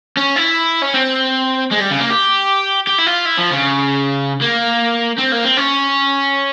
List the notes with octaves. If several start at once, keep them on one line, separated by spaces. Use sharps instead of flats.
C#4
E4
C#4
C4
G#3
G3
C#3
A#3
G4
G4
E4
F4
E4
F3
C#3
A#3
C4
A#3
C4
C#4